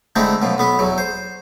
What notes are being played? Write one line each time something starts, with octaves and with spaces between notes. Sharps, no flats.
D3 G#3 A3 C4 D#4 E4
F#2 B2 F3
B1 B3 B4
E2 F#3
C5